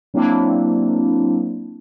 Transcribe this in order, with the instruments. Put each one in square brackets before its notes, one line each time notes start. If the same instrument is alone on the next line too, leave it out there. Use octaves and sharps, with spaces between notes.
[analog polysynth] F#3 A#3 C4 D4 E4